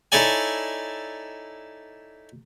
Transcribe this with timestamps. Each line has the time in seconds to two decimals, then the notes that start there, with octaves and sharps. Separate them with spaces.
0.12 D#4 E4 A4 C#5 D5 G#5